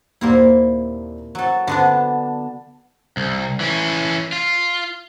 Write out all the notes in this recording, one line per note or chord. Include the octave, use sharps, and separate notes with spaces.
D#2 A#2 A#3 C4 E4
F#3 A4
D3 B3 D4 A5
C2
E3 C#4
F4